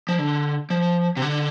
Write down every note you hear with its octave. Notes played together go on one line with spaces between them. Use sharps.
F3
D3
F3
C3
D3